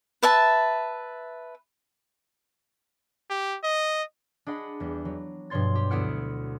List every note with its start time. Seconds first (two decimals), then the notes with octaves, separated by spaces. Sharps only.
0.23 B4 E5 A5
3.30 G4
3.63 D#5
4.46 D4 G#4 D#5 F#5 B5
4.80 E2 G3
5.05 F#3
5.50 G2 B2 F3 C#5 C6 A6
5.75 G4
5.90 D2 B3 E4 F#5 F6 D7